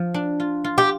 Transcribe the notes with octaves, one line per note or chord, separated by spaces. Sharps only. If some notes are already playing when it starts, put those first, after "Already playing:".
Already playing: F3
D4
F4
F4
G4